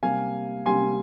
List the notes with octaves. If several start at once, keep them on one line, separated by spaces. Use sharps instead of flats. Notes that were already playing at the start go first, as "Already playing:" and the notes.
C3 G3 A#3 F5 G#5
C3 G3 A#3 G#5 C6